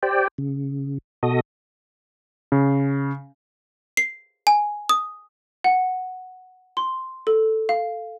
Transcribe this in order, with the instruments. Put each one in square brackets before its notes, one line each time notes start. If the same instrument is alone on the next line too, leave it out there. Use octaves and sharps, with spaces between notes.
[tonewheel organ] G4 C5 D5 G5
C#3
B2 F#4 A4 D#5 D#6
[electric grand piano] C#3
[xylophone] C7
G#5
D#6
F#5
C6
A4
F5